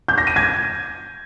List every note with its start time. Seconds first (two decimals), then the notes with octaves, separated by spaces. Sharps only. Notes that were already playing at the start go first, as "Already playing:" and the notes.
0.08 G6
0.18 A#6
0.27 D#7
0.36 G#6